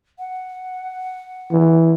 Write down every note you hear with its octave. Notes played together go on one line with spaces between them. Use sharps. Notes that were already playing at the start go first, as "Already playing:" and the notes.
F#5
E3